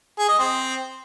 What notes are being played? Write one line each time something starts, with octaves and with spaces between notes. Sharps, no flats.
G#4
D#5
C4